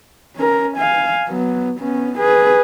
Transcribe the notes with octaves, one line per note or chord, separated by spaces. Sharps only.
C#4 A#4
F5 G#5
F#3 B3
B3 C#4
G#4 B4